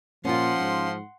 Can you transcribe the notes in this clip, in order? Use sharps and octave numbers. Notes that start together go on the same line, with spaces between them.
A#2 F3 C#4 F4 F#5 C6
G#2